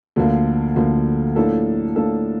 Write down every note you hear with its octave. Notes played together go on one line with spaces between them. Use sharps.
D2 D3 F3 A#3
D2 D3 F3 A#3
A2 F3 A#3 D4 A4
A2 F3 A#3 D4 A4